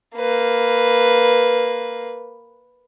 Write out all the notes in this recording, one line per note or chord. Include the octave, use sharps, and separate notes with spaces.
A#3 B4